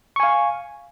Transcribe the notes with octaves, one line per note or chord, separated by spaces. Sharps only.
F5 G#5 C#6